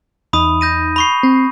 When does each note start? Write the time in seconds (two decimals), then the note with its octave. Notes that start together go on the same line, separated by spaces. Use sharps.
0.33 E2 D#4 B5 D#6
0.61 G6 A#6 D#7
0.96 B5 C#6 C7
1.23 C4